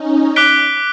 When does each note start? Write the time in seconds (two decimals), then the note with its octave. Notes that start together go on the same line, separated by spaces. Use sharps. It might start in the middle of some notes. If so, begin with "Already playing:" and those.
Already playing: C#4 D#4
0.36 D6 F#6 B6 D7 G7